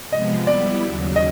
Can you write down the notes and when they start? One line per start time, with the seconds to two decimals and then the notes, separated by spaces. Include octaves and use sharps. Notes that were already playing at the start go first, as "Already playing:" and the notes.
0.11 C3 F3 G#3 B3 D#5
0.47 G3 B3 E4 D5
0.81 D#2 C#3 F#3
1.16 D#5